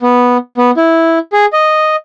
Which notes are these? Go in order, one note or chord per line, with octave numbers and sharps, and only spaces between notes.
B3
B3
E4
G#4
D#5